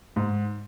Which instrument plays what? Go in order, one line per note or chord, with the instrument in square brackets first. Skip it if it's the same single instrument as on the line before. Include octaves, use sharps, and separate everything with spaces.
[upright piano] G#2